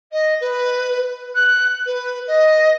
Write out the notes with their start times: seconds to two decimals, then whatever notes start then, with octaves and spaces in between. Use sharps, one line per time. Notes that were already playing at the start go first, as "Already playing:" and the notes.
0.12 D#5
0.41 B4
1.35 F#6
1.86 B4
2.27 D#5